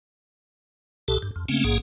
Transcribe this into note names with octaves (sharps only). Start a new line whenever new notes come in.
C2 B2 G4 A4 A5
G2
F2
C#3 A3 A#3 C4 C#4
A#1 G#2 A#3 G#4 F#5